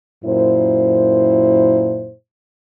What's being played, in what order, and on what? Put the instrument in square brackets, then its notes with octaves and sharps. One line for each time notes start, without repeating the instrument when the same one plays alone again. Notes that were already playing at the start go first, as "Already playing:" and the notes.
[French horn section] F#2 A#2 E4 C5